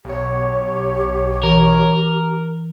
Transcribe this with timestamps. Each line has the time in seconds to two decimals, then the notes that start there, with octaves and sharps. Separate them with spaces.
0.05 B1 G4 C#5
1.44 E3 A#4